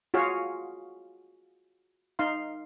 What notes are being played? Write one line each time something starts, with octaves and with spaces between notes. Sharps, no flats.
F4 F#4 G#4 C#5 F5
D#4 F5 C6